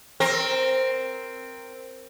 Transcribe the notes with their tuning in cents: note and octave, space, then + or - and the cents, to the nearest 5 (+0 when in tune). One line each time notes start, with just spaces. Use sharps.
C4 +0 A#4 +0